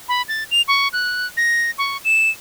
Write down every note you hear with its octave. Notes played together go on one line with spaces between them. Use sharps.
B5
A6
F7
C#6
F#6
A#6
C#6
E7